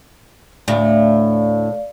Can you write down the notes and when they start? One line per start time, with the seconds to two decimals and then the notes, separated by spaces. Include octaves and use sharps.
0.68 D2 A2 D5 F5